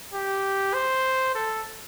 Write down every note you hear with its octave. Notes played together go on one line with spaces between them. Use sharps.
G4
C5
A4